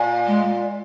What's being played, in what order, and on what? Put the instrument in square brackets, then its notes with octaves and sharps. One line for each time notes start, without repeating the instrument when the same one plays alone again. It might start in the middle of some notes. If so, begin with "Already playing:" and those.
Already playing: [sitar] A#2
[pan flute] G#3